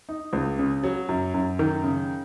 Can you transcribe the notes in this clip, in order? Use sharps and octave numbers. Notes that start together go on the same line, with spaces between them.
D#4
C#2
C#3
F#3
F#2
F#2
D#3
C#3